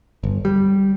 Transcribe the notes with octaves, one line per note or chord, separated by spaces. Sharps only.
G1
G3